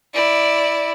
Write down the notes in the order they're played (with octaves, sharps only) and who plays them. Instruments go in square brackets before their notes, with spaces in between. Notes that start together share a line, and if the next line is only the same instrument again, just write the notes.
[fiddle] E4 D5